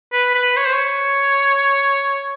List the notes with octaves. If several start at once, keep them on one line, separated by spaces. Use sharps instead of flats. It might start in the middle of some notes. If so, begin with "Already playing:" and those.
B4
B4
C#5
C5
C#5